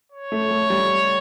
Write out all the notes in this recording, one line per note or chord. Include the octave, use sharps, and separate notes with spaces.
C#5
A3
A3
G3